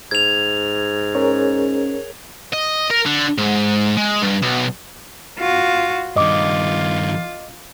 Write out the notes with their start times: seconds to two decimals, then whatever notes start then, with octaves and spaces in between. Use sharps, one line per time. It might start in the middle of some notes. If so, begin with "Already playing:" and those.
0.11 G#2 G#6 F7
1.15 C#4 G#4 A#4 C#5
2.53 D#5
2.91 A#4
3.06 D3
3.38 G#2
3.97 G#3
4.22 G2
4.42 B1
5.40 F4 F#4
6.16 G2 D#3 F4 D#5 D6